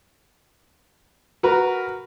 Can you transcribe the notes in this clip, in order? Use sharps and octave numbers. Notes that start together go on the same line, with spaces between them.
F#4 A#4 B4